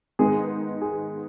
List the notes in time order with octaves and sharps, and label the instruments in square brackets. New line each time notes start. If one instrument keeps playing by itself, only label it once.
[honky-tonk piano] G#2 D#3 G#3 B3 D#4 [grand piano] G#4
[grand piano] G#4